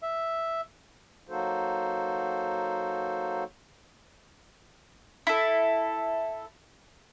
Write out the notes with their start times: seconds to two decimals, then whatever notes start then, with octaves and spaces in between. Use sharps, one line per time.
0.02 E5
1.27 F#3 A#3 D#4 F#4 A4 C5
5.27 E4 A4